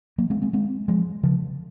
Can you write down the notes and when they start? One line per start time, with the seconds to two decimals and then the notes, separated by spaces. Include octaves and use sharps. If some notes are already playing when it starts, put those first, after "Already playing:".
0.18 F#3 A#3
0.30 G#3 C4
0.42 G#3 C4
0.53 G#3 C4
0.88 F3 G#3
1.23 C#3 F3